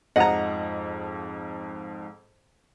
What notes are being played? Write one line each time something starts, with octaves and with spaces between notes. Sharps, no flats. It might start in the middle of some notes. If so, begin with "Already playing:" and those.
F2 G#2 F3 D#5 F#5 A#5